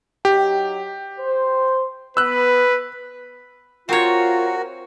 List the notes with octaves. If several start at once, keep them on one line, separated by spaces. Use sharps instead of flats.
F#3 D#4 G4 G5
C5
B3 B4 E6 F#6
C4 F4 F#4 A#4 C#5